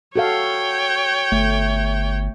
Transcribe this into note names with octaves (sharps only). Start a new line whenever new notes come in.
F#4 A4 C#5 F5 G5
G1 A3